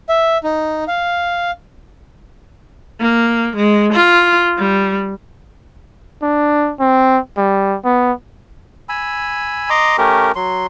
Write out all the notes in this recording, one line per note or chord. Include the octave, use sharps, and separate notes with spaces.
E5
D#4
F5
A#3
G#3
F4
G3
D4
C4
G3
B3
G#5 B5 E6
D#5 A#5 C6 D6
A3 C#4 G4 A#4
F#3 C6